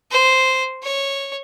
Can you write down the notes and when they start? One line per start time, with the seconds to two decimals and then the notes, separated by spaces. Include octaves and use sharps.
0.11 C5
0.83 C#5